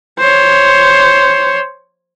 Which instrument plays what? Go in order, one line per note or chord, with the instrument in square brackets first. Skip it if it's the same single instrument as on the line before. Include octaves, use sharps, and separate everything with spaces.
[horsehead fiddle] C5 C#5